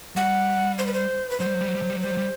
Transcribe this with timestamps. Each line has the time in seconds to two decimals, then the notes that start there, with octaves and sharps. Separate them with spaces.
0.16 G3 F#5
0.78 C5
0.87 B4
0.93 C5
1.30 B4
1.40 F#3 C5
1.46 G3
1.54 F#3
1.61 G3
1.68 F#3
1.75 G3
1.82 F#3
1.90 G3
1.96 F#3
2.02 G3 C5
2.11 F#3
2.17 G3